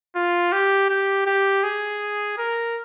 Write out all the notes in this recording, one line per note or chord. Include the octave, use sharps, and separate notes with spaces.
F4
G4
G4
G4
G#4
A#4